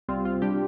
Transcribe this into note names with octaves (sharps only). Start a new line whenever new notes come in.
C2 C3 G3 C4 F4
F4
G3 D4 G4